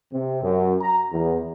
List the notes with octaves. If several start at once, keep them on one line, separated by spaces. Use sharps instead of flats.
C3
F#2
A#5
E2